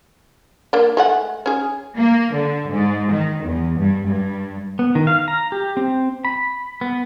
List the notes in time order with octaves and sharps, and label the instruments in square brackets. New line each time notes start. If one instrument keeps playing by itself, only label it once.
[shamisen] A#3 D4
G#3 A3 F#5
C#4 G#4
[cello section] A#3
D3
G#2
D#3
E2
G2
G2
[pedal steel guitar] B3
D#3
F5
A#5
G4
C4
B5
B3